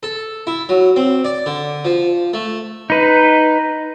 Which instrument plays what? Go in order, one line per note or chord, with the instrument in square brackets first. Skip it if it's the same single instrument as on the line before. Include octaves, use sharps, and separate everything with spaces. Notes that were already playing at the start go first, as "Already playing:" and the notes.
[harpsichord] A4
E4
F#3
C4
D5
D3
F3
A3
[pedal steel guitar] D#4 B4